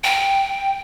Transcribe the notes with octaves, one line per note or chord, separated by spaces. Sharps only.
G5